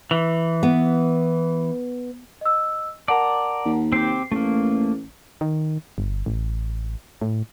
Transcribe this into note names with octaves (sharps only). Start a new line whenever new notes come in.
E3
B3
D#5 E6
A#4 D5 F#5 A5 A#5
D#2
C4 G4 C7
A1 A3 A#3
D#3
G1
A1
A2